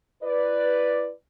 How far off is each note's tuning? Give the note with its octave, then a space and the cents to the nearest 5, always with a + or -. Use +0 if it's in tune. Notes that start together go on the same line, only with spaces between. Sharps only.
E4 +30 B4 +0 D5 +0